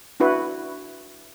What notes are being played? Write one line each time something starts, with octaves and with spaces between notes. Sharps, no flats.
D4 E4 F#4 B4